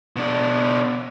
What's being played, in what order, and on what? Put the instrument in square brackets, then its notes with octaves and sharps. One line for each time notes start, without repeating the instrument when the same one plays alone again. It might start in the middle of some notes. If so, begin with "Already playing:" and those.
[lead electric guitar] B2 D4